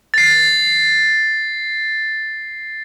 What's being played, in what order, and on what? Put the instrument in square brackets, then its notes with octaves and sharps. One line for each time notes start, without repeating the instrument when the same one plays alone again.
[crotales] A6 C7